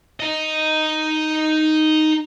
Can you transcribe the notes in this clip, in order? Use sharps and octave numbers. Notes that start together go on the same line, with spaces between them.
D#4 D#5